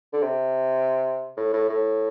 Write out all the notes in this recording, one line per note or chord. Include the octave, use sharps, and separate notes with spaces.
D3
C3
A2
A2
A2